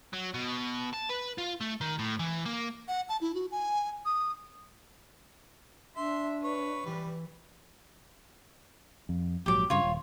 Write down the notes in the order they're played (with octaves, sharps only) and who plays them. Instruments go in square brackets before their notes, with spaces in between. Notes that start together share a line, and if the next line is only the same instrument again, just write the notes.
[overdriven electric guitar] F#3
B2
A5
B4
F4
A3
D#3
A2
E3
A#3
[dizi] F#5
A5
E4
F#4
G#5
D#6
[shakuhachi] D4 [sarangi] E5 [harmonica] C6
[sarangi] B4 [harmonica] C#5
[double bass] E3 [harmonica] G3
[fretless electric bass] F2
[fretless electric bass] A#1 G#2 F#3 [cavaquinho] G4 D6
[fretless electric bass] G2 C#3 [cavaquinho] F4 C#5
[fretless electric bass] D#1